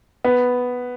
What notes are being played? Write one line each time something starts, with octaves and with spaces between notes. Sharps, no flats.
B3